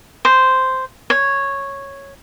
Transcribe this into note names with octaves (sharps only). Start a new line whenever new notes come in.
C5
C#5